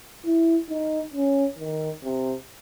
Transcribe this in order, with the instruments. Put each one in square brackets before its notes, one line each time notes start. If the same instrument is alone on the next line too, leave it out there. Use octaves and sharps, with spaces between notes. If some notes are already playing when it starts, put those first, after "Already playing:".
[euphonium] E4
D#4
C#4
D#3
C3